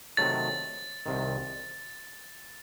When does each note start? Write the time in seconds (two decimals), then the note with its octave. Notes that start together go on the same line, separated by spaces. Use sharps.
0.17 C3 D#3 F#3 A3 A6
1.06 C2 C3 D#3